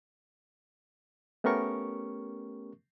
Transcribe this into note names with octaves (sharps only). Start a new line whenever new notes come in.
A3 B3 C#4 G4 A#4 C#6